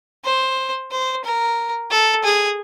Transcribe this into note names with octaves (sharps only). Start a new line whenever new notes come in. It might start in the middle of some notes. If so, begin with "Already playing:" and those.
C5
C5
A#4
A4
G#4